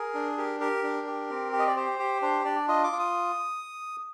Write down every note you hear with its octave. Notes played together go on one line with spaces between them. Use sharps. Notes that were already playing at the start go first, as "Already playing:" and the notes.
Already playing: G#4 A#4
D4
G4 A#4
G4 A#4
D4
G4
C4
G4
D#5
D5
G4 C5
G4
D4 C5
D4 D5
F4 D#5
D6
F4
D#6